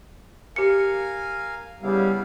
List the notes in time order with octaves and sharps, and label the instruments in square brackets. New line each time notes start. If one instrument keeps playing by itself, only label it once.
[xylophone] G4 C#7 [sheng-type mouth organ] A#4 F5 G#5
[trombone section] C#3 G3 [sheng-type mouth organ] B3 E4 F5